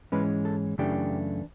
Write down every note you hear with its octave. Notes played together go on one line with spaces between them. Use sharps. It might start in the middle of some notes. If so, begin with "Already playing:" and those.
G#2 E3 G#3 C#4 B4
A4
F#2 C#3 E3 A3 D4 G4